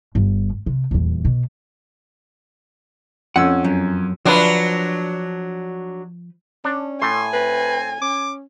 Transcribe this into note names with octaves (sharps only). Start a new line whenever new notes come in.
G1
C3
D#1 E2
B2
F2 C#4 F#5 E6
F#2
F3 F#3 D4 B4
C#4 D4
A2 A3 G#5 C6
C4 B4
C#4 D6